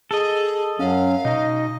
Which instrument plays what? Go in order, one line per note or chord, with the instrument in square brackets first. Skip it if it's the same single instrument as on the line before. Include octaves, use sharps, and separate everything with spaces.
[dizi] G#4 [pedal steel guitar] A4 D#5
[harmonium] F#2 F#3 [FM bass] C#4 [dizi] F5
[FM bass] B2 [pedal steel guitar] D#4 [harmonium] D#5